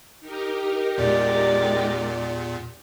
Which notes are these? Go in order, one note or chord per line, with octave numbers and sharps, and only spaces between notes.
D#4 G4 A#4
E2 A#2 G#3 D5